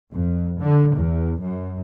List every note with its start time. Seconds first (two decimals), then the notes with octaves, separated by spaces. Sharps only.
0.12 F2
0.60 D3
0.94 E2
1.41 F#2